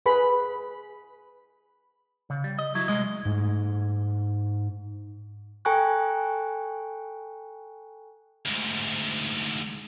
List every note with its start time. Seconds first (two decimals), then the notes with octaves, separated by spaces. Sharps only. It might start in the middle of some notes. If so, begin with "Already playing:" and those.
0.06 G#4 B4 B5
2.30 C#3
2.44 G3
2.59 D#5
2.75 F#3 E4
2.88 C2 G#3 D#5
3.25 G#2 A3
5.65 A4 G5 G#5 A#5 C#6 F#6
8.45 D2 G#2